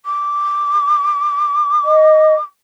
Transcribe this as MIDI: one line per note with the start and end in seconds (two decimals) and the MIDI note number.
0.05 2.43 86
1.85 2.34 75